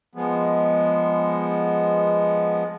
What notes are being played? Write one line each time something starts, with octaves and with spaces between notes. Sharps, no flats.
F3 G#3 B3